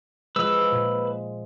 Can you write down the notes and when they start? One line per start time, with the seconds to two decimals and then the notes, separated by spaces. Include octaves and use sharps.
0.36 F3 G#3 B4 E6
0.72 A#2